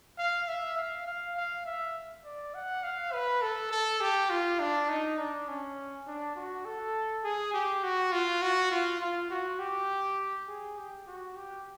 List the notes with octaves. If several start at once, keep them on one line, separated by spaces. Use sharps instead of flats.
F5
E5
F5
F5
F5
E5
D5
F#5
F5
B4
A4
A4
G4
F4
D4
D#4
D4
C#4
D4
F#4
A4
G#4
G4
F#4
F4
F#4
F4
F4
F#4
G4
G#4
G4
F#4
G4